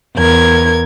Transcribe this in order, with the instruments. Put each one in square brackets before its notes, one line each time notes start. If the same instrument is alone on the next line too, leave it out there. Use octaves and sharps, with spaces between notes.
[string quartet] E2 A#4 G#6